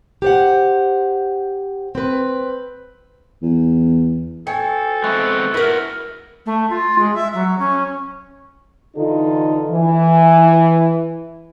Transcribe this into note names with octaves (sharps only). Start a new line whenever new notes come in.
G4 C5 F#5
C4 B4
E2
A4 C#5 G5 G#5
G#3 B3 C4 E5 C#6 F#6
E4 F#4 A#4 B4
A3
F4
G#3
E5
F#3
C#4
D3 E3 D#4 F4 A4
E3